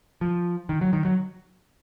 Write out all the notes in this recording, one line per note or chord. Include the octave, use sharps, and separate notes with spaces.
F3
D#3
F#3
D#3
F#3